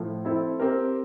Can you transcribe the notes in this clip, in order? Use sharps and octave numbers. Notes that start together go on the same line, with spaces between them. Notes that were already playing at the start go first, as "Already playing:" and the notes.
Already playing: A2 F3 A3
C4 E4 A4
C4 G4 A#4